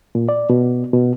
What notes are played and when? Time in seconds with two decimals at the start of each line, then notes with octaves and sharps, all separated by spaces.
0.15 A#2
0.29 D5
0.50 B2
0.93 B2